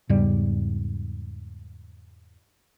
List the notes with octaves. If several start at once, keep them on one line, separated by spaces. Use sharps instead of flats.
E2 G#2 C#3 G3